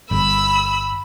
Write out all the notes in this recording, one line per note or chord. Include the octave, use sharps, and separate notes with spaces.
G1 B5 E6